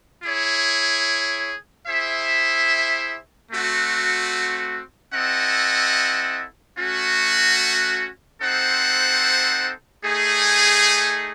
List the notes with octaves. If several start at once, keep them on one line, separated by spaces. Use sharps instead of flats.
E4 G#4 C#5
E4 G#4 C5 E5
A3 C4 F#4
C4 E4 A4 D#5 F#5
A3 C#4 F#4
C4 D#4 A4 C5 F#5
A3 D#4 G#4